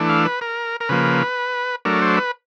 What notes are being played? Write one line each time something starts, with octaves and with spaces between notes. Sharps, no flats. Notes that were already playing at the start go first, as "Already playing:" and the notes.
Already playing: E3 A3 D4
F5
B4
A#4
A#4
C#3 F3 A#3 B4
F#3 A3 D4 A#4
C5
B4